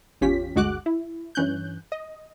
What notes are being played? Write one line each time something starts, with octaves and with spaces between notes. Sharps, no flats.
G#1 E2 C#4 F4 G4 B6
G1 D2 G#3 F#4 D6 F#6
E4
G2 E3 C#4 F#6 G6
D#5